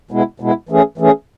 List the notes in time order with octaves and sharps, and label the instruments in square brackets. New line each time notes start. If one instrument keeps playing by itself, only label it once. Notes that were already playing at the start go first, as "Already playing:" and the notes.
[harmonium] B2 G#3 B3 E4
B2 G#3 B3 E4
E3 A3 C#4 G#4
E3 A3 C#4 G#4